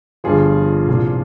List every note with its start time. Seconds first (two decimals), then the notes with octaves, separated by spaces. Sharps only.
0.24 G1 G2 F3 F4 G#4
0.87 C2 A#2 F3